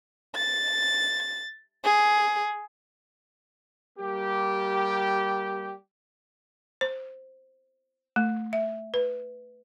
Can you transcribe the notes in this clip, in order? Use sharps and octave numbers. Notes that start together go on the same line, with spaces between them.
A6
G#4
G3 A#3 G4
C5
A3
E5
B4